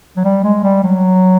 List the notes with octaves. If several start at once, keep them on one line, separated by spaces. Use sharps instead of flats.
F#3
G3
G#3
G3
F#3